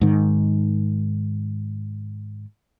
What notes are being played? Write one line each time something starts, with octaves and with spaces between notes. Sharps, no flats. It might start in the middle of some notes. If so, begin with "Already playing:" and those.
G#2 D#3